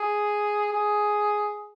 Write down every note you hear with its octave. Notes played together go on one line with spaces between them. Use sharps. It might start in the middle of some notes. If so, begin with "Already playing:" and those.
Already playing: G#4
G#4